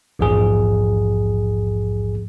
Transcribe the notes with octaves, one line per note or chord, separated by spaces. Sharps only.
A#1 E2 G#2 F3 G#4